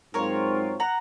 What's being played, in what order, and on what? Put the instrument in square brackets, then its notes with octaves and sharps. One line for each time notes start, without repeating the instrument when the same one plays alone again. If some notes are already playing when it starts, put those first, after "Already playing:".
[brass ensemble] G#2 F#3 C4 F4 [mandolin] A#4 C#5
[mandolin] F#5 A#5